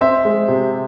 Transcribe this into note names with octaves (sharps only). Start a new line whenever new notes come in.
C4 C5 E5
G#3
C3